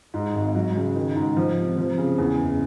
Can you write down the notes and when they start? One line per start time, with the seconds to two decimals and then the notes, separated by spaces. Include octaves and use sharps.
0.14 G#2
0.35 G#1
0.55 F#3
0.76 C#3
0.96 D#3
1.16 G#2
1.37 F3
1.57 C3
1.78 F3
1.98 C#3
2.18 E2
2.39 F#1